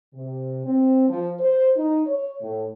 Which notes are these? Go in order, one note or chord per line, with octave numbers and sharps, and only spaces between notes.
C3
C4
F3
C5
D#4
C#5
A2